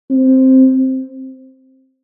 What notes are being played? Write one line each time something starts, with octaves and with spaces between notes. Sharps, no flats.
C4